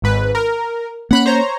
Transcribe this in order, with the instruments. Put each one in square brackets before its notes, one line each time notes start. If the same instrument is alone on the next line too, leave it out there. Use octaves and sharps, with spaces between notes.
[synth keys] G#1 G#2 B4
A#4
[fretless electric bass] A#3 C#4 [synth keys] F#5 B5 F#6
[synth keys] C5 C#5 A#5